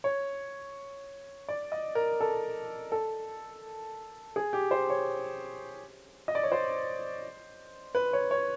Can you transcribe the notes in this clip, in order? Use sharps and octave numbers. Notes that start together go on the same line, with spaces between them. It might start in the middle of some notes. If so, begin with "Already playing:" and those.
C#5
D5
D#5
A#4
A4
A4
G#4
G4
C5
C#5
D#5
D5
C#5
C5
B4
C#5
C#5